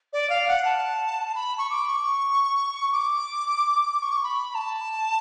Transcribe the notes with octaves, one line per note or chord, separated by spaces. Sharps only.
D5
F5
F#5
A5
B5
C#6
D6
C#6
D6
D6
C#6
B5
B5
A5